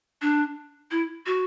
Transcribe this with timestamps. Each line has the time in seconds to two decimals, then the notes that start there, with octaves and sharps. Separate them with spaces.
0.22 D4
0.91 E4
1.26 F#4